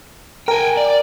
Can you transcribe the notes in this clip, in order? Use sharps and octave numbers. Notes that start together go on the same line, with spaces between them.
A#4 G5 G#5
D5